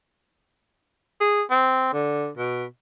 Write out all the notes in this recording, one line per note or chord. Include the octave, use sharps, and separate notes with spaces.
G#4
C4
D3
B2